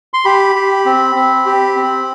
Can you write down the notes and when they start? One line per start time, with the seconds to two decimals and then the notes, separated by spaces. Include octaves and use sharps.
0.14 C6
0.25 G4 B5
0.56 G4
0.86 C4
1.16 C4
1.46 G4
1.76 C4